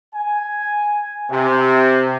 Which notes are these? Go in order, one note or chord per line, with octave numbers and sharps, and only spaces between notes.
G#5
C3